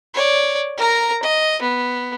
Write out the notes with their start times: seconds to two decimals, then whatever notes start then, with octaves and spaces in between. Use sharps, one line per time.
0.14 C#5 D5
0.77 A#4 A#5
1.23 D#5
1.62 B3